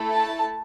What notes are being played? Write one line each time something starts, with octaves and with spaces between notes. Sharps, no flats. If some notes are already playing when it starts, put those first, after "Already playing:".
Already playing: A3 E4 A4
A5